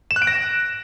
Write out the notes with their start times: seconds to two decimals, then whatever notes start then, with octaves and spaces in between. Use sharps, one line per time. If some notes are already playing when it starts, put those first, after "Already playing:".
0.11 E7
0.16 F#6
0.22 D7
0.27 A#6